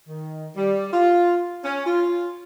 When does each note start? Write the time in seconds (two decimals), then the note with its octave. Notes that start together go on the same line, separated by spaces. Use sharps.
0.08 D#3
0.56 G3
0.93 F4
1.65 C#4
1.86 F4